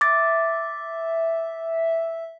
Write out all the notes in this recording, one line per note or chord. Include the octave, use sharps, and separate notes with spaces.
E5 D6 A6